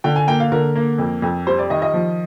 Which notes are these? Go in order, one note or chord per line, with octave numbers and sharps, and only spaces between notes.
D3 G5
G#5
A#3 G5
F5
D3 A#4
A#3
F2
F2
G3 C5
D5
D#3 D#5
D#5
F3